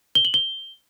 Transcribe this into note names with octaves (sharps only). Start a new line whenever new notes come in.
G7
F#7
G7